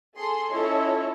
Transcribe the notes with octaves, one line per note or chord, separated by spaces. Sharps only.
G#4 A4 C6
C#4 E4 F4 A4 C#5 D#5